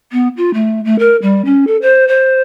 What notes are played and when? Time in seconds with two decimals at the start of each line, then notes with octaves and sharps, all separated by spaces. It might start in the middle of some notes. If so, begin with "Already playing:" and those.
0.12 B3
0.37 F4
0.54 A3
0.84 A3
0.99 A#4
1.22 G3
1.45 C#4
1.67 A4
1.82 C5
2.08 C5